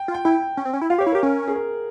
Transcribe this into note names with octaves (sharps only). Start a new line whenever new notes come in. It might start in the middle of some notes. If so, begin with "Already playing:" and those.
Already playing: G5
F4
G5
E4 G5
C#4
C4
C#4
E4
F4 F5
G4 C#5
E4
A#4
G4
C#4 A#4
G#4
A#4